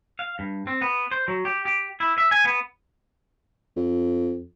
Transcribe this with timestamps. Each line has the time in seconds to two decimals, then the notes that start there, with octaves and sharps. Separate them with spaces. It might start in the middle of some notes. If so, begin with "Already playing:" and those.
0.19 F5
0.39 G2
0.67 C4
0.81 B3
1.11 C5
1.28 F#3
1.45 G4
1.65 G4
2.00 E4
2.18 E5
2.31 G#5
2.45 B3
3.77 F2